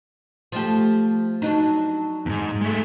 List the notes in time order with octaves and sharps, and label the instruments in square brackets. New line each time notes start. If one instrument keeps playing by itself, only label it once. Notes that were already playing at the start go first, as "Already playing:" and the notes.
[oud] F3 A3 G4
F#3 D4 D#4
[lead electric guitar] E2 G#2
G#3 A3